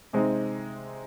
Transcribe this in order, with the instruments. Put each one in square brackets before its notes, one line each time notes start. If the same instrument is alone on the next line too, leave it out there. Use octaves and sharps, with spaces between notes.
[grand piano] C3 G#3 C4 D#4